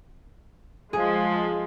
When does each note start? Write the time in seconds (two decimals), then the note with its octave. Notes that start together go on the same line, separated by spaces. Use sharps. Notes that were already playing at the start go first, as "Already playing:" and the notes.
0.93 F3 G#3 G#4